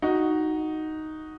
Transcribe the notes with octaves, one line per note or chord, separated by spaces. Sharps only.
D#4 F#4